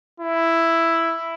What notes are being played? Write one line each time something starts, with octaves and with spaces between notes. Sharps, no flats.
E4